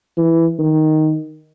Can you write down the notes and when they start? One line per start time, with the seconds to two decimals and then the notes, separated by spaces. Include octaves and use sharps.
0.17 E3
0.59 D#3